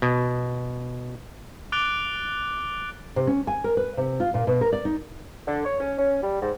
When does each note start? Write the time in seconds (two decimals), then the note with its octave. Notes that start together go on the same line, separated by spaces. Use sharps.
0.02 B2
1.72 D6 F#6 A6 D7 G7
3.16 C3
3.27 C#4
3.47 G#5
3.64 A#4
3.77 B4
3.97 C3
4.20 F4
4.34 A#2
4.47 B2
4.61 A#4
4.73 D5
4.85 D#4
5.47 D3
5.65 C#5
5.79 C#4
5.97 C#4
6.23 G3
6.41 G#2